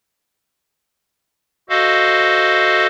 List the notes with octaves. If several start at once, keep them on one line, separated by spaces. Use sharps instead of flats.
F#4 A4 C5 D#5 F5